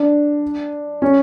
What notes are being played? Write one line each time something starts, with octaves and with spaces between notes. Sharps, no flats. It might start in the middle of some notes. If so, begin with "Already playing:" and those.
Already playing: D4
C#4